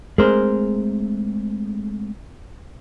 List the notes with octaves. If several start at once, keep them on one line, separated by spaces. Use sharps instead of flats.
G#3 A3 C4 G#4 A#4 C5